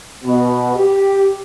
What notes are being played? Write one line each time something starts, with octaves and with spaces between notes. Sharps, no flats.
B2
G4